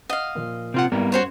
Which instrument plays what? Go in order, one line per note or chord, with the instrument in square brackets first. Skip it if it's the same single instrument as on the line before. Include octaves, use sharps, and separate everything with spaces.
[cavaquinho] D#5 F5 [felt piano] F#5
[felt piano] A#2 F3
[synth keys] C3 F4 F#5 [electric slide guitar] C4
[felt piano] G#1 E4 [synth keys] G3 [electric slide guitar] B3 A#4
[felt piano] F#2 [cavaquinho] F#4 C5 C#5